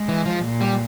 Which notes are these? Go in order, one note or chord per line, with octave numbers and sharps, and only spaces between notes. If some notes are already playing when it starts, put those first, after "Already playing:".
Already playing: G#3
E3
F3
A#2
G3